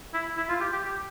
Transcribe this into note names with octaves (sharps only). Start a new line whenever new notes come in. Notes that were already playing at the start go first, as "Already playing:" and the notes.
E4
E4
F4
G4
G4
G4